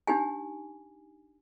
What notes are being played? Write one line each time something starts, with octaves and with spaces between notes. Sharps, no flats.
D4 D#4 G4 G#5